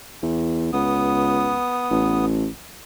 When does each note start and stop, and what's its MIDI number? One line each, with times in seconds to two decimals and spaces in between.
0.22 0.72 40
0.73 1.58 37
0.73 2.25 59
0.73 2.25 87
1.90 2.47 33